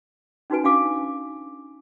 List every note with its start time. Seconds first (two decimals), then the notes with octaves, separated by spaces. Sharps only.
0.50 C#4 D#4 F#4 B4 G#5
0.64 C#4 D4 F#4 F5 G#5 D6